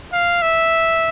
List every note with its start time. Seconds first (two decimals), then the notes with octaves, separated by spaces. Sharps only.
0.13 F5
0.42 E5